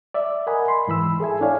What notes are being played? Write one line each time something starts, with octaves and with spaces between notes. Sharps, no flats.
D5 E5
A#4 D#5 F#5 G#5 B5
B5 C6
G#2 E3 B5 E6
G#4 A4 E5 G#5
D4 E4 C#5 D5 F5 G#5